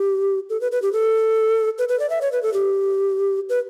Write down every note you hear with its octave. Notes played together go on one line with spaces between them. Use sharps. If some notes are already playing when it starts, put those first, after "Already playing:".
Already playing: G4
A4
B4
B4
G4
A4
B4
B4
D5
E5
C#5
B4
A4
G4
B4